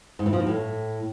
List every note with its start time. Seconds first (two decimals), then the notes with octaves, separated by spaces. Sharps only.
0.19 G#2
0.26 E3
0.33 F3
0.40 B2
0.47 A2